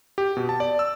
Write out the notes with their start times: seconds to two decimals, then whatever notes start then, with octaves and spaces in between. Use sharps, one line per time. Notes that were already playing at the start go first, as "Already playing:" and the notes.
0.18 G4
0.37 B2
0.49 A5
0.60 D5
0.79 E6